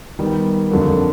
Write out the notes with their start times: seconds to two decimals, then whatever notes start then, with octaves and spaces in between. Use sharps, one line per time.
0.19 D#3 G3 B3
0.70 F2 D3 F#3 A#3